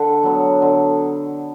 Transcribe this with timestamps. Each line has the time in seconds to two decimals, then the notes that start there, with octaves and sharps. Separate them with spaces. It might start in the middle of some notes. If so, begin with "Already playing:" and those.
Already playing: D3 F#5
0.23 F#3 B3
0.62 D3